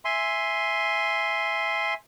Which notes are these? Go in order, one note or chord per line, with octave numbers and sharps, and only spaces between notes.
E5 G#5 C6